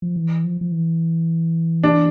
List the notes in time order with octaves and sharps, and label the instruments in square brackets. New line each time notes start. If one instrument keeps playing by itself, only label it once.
[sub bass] F3
E3
F3
F3
E3
[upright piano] D4